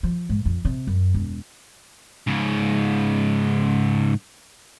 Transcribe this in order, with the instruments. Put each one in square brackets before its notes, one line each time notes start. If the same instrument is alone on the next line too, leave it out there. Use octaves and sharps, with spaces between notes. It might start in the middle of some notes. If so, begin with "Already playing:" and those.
[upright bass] F3
G#2
F2
C3
F#2
E1
[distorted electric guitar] G#2 C#3